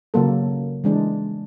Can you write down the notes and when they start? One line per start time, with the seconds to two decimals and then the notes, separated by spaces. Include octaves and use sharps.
0.14 C#3 F#3 A#3 A4
0.84 E3 G#3 D4